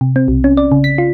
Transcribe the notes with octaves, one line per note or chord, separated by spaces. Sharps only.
C3
C4
B1
C#4
D5
C#3
B6
F4